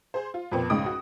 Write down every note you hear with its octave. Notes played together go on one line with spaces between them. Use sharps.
G#4 C5
F4
F2 A#2 B3 C4
C#2 G#2 C#3 D#5 D#6 D7
F#4